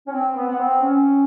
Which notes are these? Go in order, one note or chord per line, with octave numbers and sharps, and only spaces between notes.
C#4
C4
B3
B3
C4
C#4